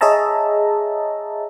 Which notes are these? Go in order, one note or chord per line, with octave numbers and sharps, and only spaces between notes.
G#4 C#5 D#5 E5 A5 A#5